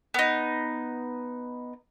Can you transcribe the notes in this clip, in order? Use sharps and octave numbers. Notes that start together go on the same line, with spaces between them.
B3 D#4